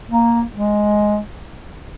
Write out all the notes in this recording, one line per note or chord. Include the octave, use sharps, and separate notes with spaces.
A#3
G#3